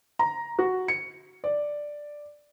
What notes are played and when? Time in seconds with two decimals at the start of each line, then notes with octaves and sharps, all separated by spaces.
0.19 A#5
0.59 F#4
0.88 C#7
1.44 D5